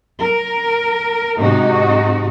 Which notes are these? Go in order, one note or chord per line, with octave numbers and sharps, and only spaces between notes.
A#4
G#2 C3 D#4 F#4